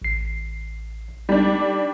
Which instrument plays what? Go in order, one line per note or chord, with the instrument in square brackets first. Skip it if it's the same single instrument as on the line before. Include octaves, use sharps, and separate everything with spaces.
[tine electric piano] A1 C7
[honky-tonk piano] G3 D4 [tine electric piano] D#4